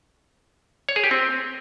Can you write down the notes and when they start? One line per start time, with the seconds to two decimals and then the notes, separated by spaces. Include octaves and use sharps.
0.89 C#5
0.96 G#4
1.04 G4
1.11 C4